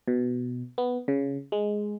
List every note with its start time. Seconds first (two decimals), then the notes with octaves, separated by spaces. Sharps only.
0.08 B2
0.78 B3
1.08 C#3
1.52 G#3